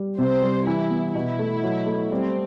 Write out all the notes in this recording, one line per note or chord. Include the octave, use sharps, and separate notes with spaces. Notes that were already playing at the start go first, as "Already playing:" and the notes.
Already playing: G3
C3 C5
G3
E3 E4
B3
B2 E4
A3
F#3
A3
G3 C4